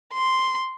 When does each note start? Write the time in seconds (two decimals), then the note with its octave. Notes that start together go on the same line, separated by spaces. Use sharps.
0.14 C6